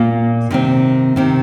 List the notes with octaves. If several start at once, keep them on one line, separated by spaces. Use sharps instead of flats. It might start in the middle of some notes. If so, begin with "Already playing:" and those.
Already playing: A#2 A#3 F4
C3 D#3 C4
C3 D#3 C4